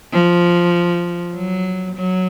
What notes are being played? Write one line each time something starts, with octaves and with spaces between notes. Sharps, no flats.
F3
F#3
F#3